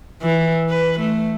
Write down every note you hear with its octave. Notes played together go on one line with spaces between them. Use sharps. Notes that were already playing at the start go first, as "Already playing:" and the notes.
E3
B4
A3